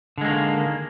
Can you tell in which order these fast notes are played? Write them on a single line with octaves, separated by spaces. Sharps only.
D3 G#3 A#3 D#3